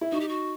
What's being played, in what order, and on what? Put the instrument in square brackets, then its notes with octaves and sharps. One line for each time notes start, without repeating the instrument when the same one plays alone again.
[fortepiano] E4
[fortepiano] D#4 [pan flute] F#4
[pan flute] G4
F#4